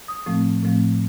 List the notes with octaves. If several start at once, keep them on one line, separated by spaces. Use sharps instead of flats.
D#6
A2 F3 A3 C4
A2 F3 A3 C4